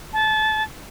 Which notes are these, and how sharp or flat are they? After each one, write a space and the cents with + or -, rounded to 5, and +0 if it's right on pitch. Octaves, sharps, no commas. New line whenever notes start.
A5 -25